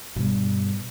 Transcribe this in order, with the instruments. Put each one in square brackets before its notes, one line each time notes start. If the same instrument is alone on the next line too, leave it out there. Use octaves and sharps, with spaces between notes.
[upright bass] G2 B2